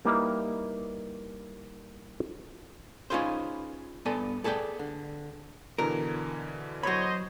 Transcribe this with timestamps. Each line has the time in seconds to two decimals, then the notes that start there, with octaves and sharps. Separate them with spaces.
0.05 G3 A#3 D#4 E4 B4
3.10 C#4 D#4 F4 G#4 B4 C5
4.05 G2 B3 A4 D5 G#5
4.44 G#4 A4 B4 D5 G5
4.79 D3
5.78 B2 D3 E3 A#4
6.83 F#3 C5 C#5 D#5 B5